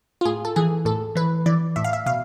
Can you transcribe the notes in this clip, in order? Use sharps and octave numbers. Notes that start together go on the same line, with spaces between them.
F4
A2 G#4
A4
E3 G#4
A2 A4
E3 B4
E3 D5
A2 E5
F5
E5
B2 F5